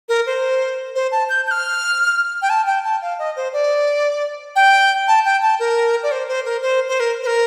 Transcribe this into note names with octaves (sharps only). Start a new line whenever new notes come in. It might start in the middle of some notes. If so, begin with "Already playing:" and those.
A#4
C5
C5
A5
G6
G6
F6
G5
A5
G5
A5
F5
D#5
C5
D5
G5
A5
G5
A5
A#4
D5
C5
C5
A#4
C5
C5
A#4
C5
A#4